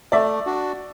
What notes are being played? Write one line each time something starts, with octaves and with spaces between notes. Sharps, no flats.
A3 D5 E5
D4 F#4